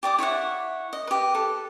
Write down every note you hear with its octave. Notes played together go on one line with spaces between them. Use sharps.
G4 D5 D6 D#6
E4 C#5 E5 F#5
D#5
G4 B4
A4